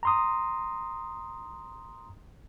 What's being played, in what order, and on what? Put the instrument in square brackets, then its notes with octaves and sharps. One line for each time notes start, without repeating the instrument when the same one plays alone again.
[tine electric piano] A#5 C6 D#6